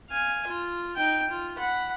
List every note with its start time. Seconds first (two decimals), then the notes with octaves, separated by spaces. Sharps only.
0.10 F5 G#5
0.47 F4
0.96 D#4 G5
1.30 F4
1.58 F#5 B5